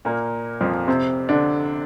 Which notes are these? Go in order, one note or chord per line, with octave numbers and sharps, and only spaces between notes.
A#2 A#3
F2 F3
C3 C4
D3 D4